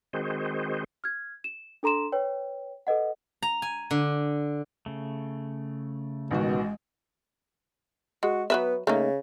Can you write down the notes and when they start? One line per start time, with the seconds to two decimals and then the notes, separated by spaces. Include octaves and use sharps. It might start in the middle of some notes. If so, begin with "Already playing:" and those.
0.13 D#3 G#3 C4 F#4 G#4 C5
1.04 F6 G#6
1.44 E7
1.83 D4 A4 A#5 C6 E7
2.12 B4 C#5 G5
2.87 A4 B4 D#5 F#5
3.42 A#5
3.62 G#5
3.91 D3
4.86 C#3 A3
6.31 A1 B2 D#3 G#3 F#4
8.23 G#3 F#4
8.50 F#3 B3 B4 E5
8.87 C#3 A3 A#3 D#4